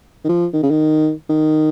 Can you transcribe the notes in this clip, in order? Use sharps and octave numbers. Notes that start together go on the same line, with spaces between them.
D#3
F3
D#3
C#3
D#3
D#3